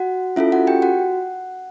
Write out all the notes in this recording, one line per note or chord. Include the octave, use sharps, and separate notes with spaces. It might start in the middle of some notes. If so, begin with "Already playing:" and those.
Already playing: F#4 F#5
C#4 E4 F4 A4 E5
F#4 F#5
G4 G5
F#4 F#5